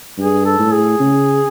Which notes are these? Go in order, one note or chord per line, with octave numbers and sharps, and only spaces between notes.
G2 G#4
A4
A2
G#4
C#3